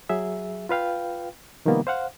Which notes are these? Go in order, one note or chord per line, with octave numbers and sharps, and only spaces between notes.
F#3 G#4 E5
F4 B4 F5 G5
C3 D#3 F3 G3 A#3 B3
C5 F5 F#5